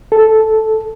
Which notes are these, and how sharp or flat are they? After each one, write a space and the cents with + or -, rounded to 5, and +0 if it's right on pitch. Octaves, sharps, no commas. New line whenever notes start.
A4 -5